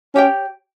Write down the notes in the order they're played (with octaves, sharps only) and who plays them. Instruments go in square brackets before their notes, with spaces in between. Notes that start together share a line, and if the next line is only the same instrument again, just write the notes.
[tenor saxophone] C#4 [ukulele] G4 C#5 G5